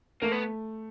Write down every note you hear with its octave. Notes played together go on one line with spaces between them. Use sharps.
A3 A#3
B3